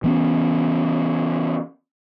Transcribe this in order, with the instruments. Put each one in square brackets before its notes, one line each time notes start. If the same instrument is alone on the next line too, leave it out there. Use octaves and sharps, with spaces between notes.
[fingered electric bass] E3 B3 C#4